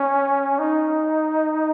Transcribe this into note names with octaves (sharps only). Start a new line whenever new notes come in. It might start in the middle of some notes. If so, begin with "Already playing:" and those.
Already playing: C#4
D#4